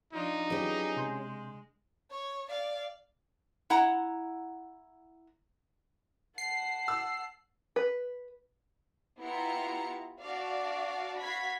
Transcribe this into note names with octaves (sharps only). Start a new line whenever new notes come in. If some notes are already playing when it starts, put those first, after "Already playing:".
F3 D4 D#4 F4
F#3 C#4 F4 G4 G#4 B4
C3 G#3 C6 G6
C#5
D5 F5
E4 F#5 A#5
F#5 A5 C7
E6
B4
B3 E4 F4 G4 A#5 C#7
D4 F#4 D5 F5 A5
F#4 F5 B5 G#6 B6